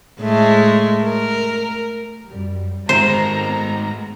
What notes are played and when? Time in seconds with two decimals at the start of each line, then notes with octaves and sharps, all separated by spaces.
0.21 A2 G#3 A3
1.05 A#4
2.29 F#2 G3
2.89 G#2 D#3 G#3 A3 B3 C5 A#5